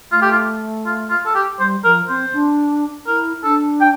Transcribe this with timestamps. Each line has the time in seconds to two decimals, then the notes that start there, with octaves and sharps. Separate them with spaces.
0.11 A3 F4
0.22 G4
0.31 F4
0.86 F4
1.10 F4
1.26 A4
1.35 G4
1.59 G3 C5
1.84 F3 A#4
2.08 C4 C5
2.33 D4
3.07 E4 A#4
3.44 D4 A4
3.81 G5